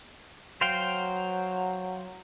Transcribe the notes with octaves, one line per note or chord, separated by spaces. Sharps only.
F#3 C5 F5 G5